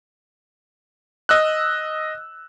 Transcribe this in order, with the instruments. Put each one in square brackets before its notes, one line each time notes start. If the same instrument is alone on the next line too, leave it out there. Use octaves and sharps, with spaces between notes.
[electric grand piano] D#5 E6 F#6